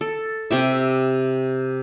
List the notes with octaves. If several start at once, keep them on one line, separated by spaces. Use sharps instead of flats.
A4
C3 G4 E5